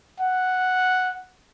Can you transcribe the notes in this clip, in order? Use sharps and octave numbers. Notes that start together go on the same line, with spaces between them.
F#5